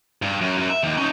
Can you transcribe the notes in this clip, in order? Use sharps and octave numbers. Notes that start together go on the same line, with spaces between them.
G2
F#2
F#2
E5
D#2
C#4 D#4